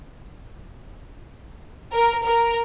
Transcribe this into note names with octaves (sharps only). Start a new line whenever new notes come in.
A#4
A#4